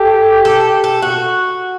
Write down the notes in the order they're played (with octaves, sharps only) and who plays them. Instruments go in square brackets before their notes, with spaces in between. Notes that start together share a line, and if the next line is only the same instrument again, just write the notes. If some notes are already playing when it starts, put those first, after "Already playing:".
Already playing: [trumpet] G4 [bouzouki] A4
[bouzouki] A4
A4
F#4